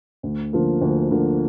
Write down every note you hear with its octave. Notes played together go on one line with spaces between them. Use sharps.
D2
D3 F3 A#3
D2
D3 F3 A#3